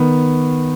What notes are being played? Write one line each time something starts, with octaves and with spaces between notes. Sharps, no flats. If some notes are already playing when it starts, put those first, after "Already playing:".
Already playing: D#3 B3